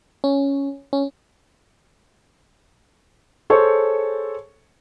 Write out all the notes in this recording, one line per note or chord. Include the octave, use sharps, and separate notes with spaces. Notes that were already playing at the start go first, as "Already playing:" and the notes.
C#4
C#4
G#4 A4 C5 C#5 C#6